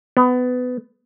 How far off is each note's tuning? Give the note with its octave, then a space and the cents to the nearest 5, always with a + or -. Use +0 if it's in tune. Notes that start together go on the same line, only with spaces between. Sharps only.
B3 +20